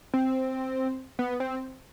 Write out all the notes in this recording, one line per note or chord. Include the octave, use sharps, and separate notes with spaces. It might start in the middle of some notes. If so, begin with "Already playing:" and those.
C4
B3
C4